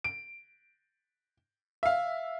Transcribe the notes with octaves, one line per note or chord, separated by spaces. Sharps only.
D7
E5 F5